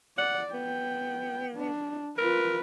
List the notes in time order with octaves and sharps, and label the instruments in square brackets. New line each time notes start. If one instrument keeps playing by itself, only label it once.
[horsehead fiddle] D5 [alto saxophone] F#5
[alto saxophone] B3 [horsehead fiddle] G5
[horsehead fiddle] D4
[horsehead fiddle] F4 B4 [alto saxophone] A#4